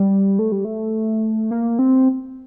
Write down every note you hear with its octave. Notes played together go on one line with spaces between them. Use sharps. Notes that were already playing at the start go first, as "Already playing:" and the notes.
Already playing: G3
A3
G3
A3
A#3
C4